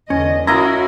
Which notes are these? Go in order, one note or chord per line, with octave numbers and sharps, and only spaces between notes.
E2 D3 C#4 D#5
C#4 E4 F#4 A#4 D#5 F5 A#5